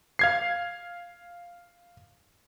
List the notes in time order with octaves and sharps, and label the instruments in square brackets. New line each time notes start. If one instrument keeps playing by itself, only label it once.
[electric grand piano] F5 G#6 C7